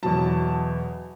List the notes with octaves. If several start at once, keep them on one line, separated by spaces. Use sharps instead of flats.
E2 B2 F#3 A5